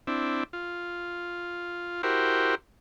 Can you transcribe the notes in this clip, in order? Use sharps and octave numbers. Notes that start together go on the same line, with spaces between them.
C4 D4 E4
F4
E4 F#4 G4 A#4 C5